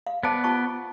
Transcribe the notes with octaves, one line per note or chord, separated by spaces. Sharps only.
F5
B3 C5 D5 A5
F4 A5 C#6